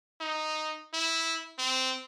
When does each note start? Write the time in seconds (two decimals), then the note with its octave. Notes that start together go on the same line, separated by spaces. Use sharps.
0.20 D#4
0.94 E4
1.58 C4